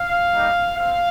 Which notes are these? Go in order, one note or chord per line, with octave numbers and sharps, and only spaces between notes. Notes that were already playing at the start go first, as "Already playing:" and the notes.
Already playing: F5
G3 A#3 D#4 G4
C4 F5